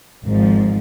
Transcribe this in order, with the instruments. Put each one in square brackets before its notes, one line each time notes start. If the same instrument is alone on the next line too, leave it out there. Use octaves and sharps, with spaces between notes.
[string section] G#1 G#2 F3